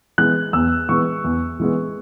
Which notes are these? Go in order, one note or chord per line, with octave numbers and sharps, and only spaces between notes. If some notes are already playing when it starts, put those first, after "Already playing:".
E3 G#3 B3 F#6
E2 E6
E3 G#3 B3 C#6
E2
E3 G#3 B3